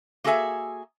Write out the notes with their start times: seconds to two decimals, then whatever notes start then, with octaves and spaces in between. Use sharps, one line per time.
0.24 A#3 F#4 G#4 A4 E5 G#5